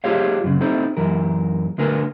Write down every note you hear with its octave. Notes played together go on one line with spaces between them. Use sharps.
F4 G4 G#4 C5 C#5 F5
F#2 C#3
C4 D#4 E4 A4 C5
F#2 E3 A#4
D2 D3 A#4 B4 G#5